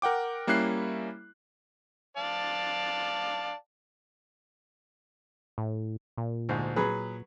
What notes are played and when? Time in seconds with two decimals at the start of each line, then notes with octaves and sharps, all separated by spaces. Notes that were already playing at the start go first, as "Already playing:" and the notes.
0.02 A#4 F#5 G5 D6
0.47 G3 A#3 C#4 E4 F#6 C7
2.17 D5 F5 A5
5.58 A2
6.18 A#2
6.49 D2 G#2
6.76 F#3 G#4 B4